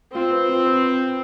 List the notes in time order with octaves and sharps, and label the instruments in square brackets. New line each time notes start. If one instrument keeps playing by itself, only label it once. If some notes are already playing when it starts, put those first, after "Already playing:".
[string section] C4 [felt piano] F4
[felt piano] B4
F4
B4